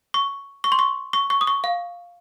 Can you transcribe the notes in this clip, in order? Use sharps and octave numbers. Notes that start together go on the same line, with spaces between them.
C#6
C#6
C6
C#6
C#6
C#6
D#6
C#6
F5